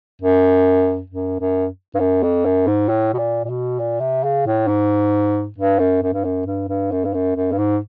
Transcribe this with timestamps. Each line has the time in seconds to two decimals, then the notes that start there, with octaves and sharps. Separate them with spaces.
0.22 F#2
1.10 F#2
1.40 F#2
1.95 G2
2.00 F#2
2.23 F2
2.45 F#2
2.67 G#2
2.89 A2
3.14 B2
3.19 A#2
3.45 A#2
3.50 B2
3.79 A#2
4.01 C3
4.24 C#3
4.46 A2
4.68 G#2
5.58 G2
5.79 F#2
6.03 F#2
6.14 G2
6.24 F#2
6.47 G2
6.69 G2
6.92 F#2
7.05 G2
7.14 F#2
7.36 F#2
7.52 G2
7.58 G#2